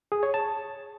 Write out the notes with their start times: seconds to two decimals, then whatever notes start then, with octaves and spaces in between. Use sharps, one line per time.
0.12 G#4
0.23 C#5
0.34 A5